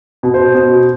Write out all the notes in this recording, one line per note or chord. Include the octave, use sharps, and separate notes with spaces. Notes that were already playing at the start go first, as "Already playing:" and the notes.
B2
C5
B2